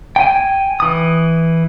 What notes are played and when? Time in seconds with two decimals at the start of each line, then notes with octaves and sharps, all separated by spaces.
0.16 G5 G#5
0.80 E3 D#6